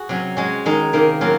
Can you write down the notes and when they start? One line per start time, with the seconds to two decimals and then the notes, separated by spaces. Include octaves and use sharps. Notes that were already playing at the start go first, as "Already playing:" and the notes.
Already playing: F#4 G#4
0.09 C3 F#3 C#4
0.37 G#3 C#4 F#4
0.66 D#3 G#3 D#4
0.93 C3 D#3 A#3
1.21 F#3 A#3 C#4 F4